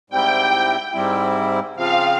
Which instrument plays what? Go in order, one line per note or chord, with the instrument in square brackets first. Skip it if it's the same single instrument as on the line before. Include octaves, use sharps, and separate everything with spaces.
[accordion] G#2 G3 C4 E4 [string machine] G5
[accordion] G#2 G3 C4 E4
[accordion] C#3 F3 C4 F4 [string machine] F5